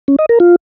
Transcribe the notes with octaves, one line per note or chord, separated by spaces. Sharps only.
C#4
D#5
A#4
F4